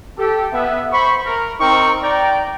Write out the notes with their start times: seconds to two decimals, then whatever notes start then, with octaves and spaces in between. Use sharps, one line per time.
0.18 G4 A4
0.53 B3 E5
0.92 C5 B5 C#6
1.25 A#4
1.60 C4 D#4 A#4 C5 G5 C#6
2.03 D5 G5 A#5